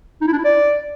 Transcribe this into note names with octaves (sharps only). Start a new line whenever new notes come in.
D#4
E4
D4
E4
D5